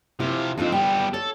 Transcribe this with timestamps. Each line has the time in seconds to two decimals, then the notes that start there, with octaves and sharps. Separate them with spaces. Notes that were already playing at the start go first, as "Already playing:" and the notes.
0.20 C3 E4 F4
0.58 F2 C4 D4 D#4 F4
0.72 G3 B3 G5
1.14 A4 C#5